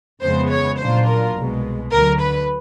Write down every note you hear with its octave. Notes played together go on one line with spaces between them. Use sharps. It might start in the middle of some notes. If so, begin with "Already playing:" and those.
F2 C#3 E3 G#3 B3 C5
C#5
A#2 F#3 A#3 D4 F4 C5
A#4
C2 B2 G#3
D2 D3 F#3 A#4
B4